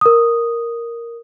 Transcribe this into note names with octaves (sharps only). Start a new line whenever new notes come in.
A#4 D#6